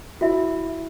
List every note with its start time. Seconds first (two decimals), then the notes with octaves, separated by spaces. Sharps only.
0.21 E4 F#4 E5